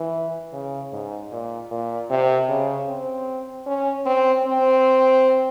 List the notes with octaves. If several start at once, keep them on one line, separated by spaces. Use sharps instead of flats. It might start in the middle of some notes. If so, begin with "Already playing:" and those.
Already playing: E3
C#3
G#2
A#2
A#2
C3
C#3
C4
C#4
C4
C4